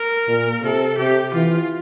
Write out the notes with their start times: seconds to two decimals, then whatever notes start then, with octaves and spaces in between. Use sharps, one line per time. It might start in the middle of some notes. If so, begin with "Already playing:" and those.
Already playing: A#4
0.28 A#2
0.62 C3 A4
0.98 C3 G4
1.33 E3 F4